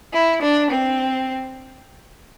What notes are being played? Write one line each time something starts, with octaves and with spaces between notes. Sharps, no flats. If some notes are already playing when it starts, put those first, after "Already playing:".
E4
D4
C4